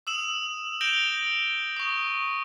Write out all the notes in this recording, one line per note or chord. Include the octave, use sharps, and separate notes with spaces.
D#6 E6 E7 F#7
G6 A#6 D7 E7 F7 G7
C#6 D#6